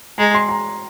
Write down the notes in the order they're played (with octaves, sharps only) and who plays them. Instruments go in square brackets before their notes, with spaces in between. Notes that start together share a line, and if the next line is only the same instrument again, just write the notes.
[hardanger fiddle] G#3 [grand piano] A#5
[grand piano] C6
A#5